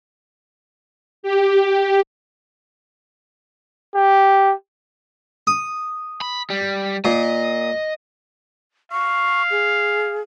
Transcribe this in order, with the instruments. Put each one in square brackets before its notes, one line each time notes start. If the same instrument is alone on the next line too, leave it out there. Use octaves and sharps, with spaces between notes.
[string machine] G4
[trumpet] G4
[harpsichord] D#6
[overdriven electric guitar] B5
G3
[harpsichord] A#2 [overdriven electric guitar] D#5
[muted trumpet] F5 [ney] C#6
[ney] G#4